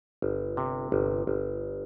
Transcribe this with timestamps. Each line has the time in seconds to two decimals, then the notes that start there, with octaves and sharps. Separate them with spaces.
0.22 G1
0.57 C3
0.92 G1
1.27 G1